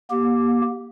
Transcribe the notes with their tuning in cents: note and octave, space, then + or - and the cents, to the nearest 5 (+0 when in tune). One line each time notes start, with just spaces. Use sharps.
A#3 +40 G4 +0